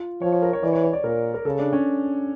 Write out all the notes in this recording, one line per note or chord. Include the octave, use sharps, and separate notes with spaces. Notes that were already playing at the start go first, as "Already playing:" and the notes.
Already playing: F4
F3 C#5
C#5
A#4
C#5
E3 D5
C#5
C#5
D5
A#2 A#4
A#4
C#3 A4
D4
C#4